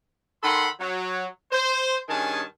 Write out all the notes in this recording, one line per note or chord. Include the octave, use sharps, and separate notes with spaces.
D#3 A4 F#5 B5 C6
F#3
C5
G2 D#3 C#4 G#4 G#5 A5